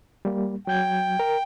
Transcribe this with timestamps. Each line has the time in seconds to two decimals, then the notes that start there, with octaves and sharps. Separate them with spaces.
0.25 G3 A#3
0.67 F#3 G5 G6 G#6
1.19 A#4